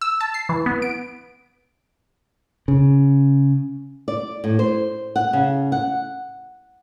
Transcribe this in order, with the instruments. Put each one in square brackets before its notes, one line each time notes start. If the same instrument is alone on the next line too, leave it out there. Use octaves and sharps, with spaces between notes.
[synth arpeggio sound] E6
A5
C7
E3
B3
D7
[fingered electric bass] C#3
[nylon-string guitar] D5
A2
C5
F#5
C#3
F#5